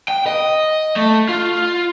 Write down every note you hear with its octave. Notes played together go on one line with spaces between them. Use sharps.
G5
D#5
A3
F4